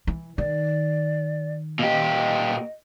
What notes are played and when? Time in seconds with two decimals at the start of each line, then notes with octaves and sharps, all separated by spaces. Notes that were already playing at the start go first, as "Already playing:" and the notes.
0.07 E3
0.38 D#3 D5
1.79 A#2 G4 D#5